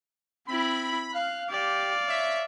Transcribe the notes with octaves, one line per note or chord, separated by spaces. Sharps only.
C4 E4 B5
F5 F#6
G4 D5 F5
C#5 E5